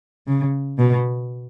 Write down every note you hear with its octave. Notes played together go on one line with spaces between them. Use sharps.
C#3
B2